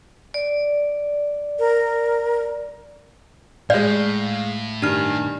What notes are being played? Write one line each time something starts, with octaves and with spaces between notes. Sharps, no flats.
D5
A#4
A2 G#3 D5 F5 G6
G2 D#3 D4 F6